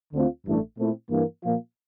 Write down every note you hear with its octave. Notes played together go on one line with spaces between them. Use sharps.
D2 D3 A3 C4 F4
A1 G2 E3 A3 D4
A#2 A3 C4 E4
G2 E3 A#3
A#2 F3 A#3 F4